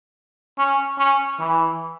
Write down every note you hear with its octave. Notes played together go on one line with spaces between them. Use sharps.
C#4
C#4
E3